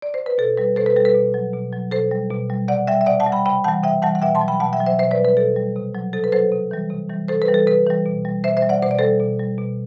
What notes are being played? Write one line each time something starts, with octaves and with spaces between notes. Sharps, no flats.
D5
C5
B4
B2 A4
G3 B4
B2 A4 C5
B4
G3 A4
B4
B2
F#3
B2
F#3
B2 A4 C5
G3
B2
G3
C3 D5 F#5
G3 E5 G5
E5
C3 D5 F#5
F#5 A5
G3
G5 B5
C3 G5 B5
E3 G3 F#5 A5
C3 E5 G5
E3 G3 F#5 A5
F#5
B2 E5 G5
A5 C6
F#3
G5 B5
B2 F#5 A5
E5 G5
F#3
C5 E5
B2 C5 E5
B4 D5
G3
B4
B2 A4
G3
C3
F#3
C3 A4
B4
F#3 A4 C5
C3
E3 G3
C3
E3 G3
C3 A4 C5
B4
E3 G3
A4
C3 B4
E3 G3
B2
G3
B2 C5 E5
C5 E5
G3
D5 F#5
B2 C5
D5
G3 A4 C5
B2
G3
B2